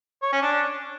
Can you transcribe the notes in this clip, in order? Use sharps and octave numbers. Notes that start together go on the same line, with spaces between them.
C#5
C#4
D4